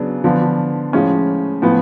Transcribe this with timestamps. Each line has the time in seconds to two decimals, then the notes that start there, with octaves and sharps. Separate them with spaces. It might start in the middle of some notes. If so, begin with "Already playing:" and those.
Already playing: C#3 F#3 B3 D4
0.24 D3 F3 B3 D4
0.93 A2 F3 G#3 C#4
1.62 A2 F3 B3